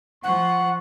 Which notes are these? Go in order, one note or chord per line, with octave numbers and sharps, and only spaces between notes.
F3 F#5 C#6